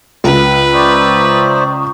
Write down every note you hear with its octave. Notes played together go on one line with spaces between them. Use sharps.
C#2 B4
C5 D5 E5 A#5 C#6 D#6